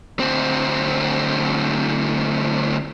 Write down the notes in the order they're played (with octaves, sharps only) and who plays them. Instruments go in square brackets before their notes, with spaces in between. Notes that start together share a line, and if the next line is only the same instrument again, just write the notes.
[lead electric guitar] D2 C4